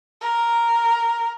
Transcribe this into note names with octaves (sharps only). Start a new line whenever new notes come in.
A#4